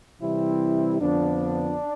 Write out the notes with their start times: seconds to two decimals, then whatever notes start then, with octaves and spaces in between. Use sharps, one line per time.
0.21 C3 E3 G3 C4 E4
1.00 F2 D3 F3 B3 D4